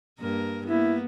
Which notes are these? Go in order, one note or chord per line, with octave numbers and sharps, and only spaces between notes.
G2 A#3 A#4
A#3 B3 E4